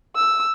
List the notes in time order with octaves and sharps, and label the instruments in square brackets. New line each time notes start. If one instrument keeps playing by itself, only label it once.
[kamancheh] E6